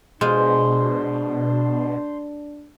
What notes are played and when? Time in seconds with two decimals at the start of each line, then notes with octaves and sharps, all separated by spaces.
0.21 B2 G#3 D4 F4 C5